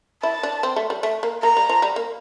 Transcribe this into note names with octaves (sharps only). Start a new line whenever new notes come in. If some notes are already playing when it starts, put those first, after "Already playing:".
E4 A5
D4
C4
A3
G3
A3
A#3
A#3 A#5
G3
F3
G3
A#3